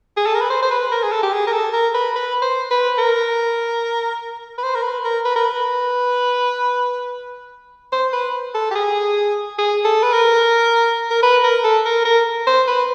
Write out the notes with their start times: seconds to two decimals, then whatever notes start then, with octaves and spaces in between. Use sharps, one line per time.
0.17 G#4
0.26 A4
0.34 A#4
0.41 B4
0.50 C5
0.63 C5
0.71 B4
0.92 A#4
1.03 G#4
1.12 A4
1.23 G4
1.33 G#4
1.47 A#4
1.53 A4
1.73 A#4
1.95 B4
2.16 B4
2.42 C5
2.71 B4
2.98 A#4
4.58 B4
4.63 C5
4.75 A#4
4.83 B4
5.04 A#4
5.25 B4
5.36 A#4
5.45 B4
7.92 C5
8.13 B4
8.55 A4
8.71 G4
8.75 G#4
9.58 G#4
9.85 A4
10.03 B4
10.13 A#4
11.10 A#4
11.23 B4
11.44 A#4
11.64 A4
11.85 A#4
12.05 A#4
12.47 C5
12.67 B4